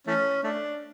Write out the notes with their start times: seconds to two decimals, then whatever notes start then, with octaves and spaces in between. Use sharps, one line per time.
0.07 E3 A3 C#4
0.43 A3 D4